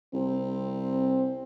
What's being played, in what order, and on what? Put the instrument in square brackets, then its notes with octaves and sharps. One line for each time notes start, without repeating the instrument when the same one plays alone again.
[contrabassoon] C2 [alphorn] C4